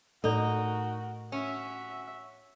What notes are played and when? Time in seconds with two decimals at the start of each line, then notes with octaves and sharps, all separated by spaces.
0.24 A2 A3 D#4 F#4 A4 A#4 D5
1.32 C#4 F#4 E5